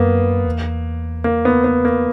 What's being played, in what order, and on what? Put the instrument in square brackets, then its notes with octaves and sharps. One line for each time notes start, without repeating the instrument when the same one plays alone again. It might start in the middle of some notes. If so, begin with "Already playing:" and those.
Already playing: [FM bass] F#2 [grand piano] A#3 B3
[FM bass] E2
[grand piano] A#3
B3
B3
A#3